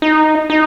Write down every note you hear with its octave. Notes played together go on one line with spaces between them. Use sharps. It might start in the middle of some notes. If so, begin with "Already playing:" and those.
D#4
D#4